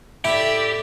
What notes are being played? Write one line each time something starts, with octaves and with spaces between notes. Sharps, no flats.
A2 E4 G4 A4 C#5 D5 E5